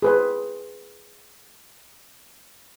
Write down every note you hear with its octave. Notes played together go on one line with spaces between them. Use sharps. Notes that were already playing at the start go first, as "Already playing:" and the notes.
G#4 B4 C5